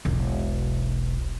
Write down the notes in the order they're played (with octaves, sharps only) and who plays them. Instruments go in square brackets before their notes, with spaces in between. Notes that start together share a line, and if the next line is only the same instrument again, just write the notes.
[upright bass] E1 B1